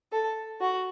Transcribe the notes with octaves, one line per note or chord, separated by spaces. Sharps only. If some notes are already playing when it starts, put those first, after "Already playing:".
A4
F#4